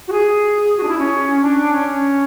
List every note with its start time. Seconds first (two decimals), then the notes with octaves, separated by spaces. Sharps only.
0.07 F#4
0.12 G#4
0.77 F#4
0.83 D4
0.88 E4
0.98 C#4
1.41 D4
1.72 C#4